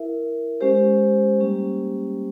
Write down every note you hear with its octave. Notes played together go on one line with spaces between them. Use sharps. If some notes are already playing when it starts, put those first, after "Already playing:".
Already playing: E4 A#4 E5
G#3 C#4 G4 C5
G3 A#3 C#4 G4